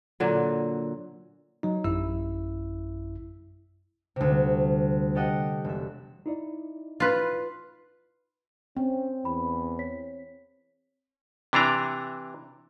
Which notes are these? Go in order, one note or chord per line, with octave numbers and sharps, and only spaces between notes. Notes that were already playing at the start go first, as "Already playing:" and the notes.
A#2 D3 F#3
F#3 D#4
A1 F#2 E4 E6
D2 C3
G3
G4 A4 D#5 F#5 G5
E1 E5
D#4 E4 D5
F4 B4
C4 C#4
E2 B5
C#5 B6
C3 E3 D4 A#5